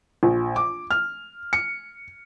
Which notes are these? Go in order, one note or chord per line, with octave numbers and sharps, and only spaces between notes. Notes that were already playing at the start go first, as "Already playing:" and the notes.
A#1
D6
F6
C#7